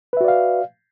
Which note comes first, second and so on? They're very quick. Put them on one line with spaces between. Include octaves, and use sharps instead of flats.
B4 E5 F#4 D5 F5